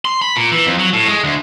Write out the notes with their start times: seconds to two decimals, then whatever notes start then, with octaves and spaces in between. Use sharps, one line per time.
0.05 C6
0.22 B5
0.36 A#2
0.52 E3
0.66 F2
0.79 F#3
0.93 A2
1.08 G#3
1.24 D2